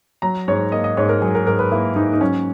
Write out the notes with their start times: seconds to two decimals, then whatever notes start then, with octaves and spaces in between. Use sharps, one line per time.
0.22 F#3 A#5
0.48 G#2 C#5
0.72 A#3 D#5
0.84 D#5
0.97 G#2 C#5
1.09 A#4
1.22 F#3 G#4
1.35 A#4
1.47 G#2 A#4
1.59 B4
1.72 A#3 E4
1.96 G#2 D#4
2.13 D#4
2.21 F#3 C#4